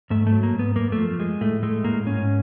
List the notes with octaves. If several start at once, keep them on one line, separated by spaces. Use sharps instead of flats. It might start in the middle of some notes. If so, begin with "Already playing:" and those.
G#2 A3
A3
F#3
A#3
G#2
B3
F#2 A#3
A3
F3
G#3
A2 A3
G#3 A3
A2 A#3
G#2 C#4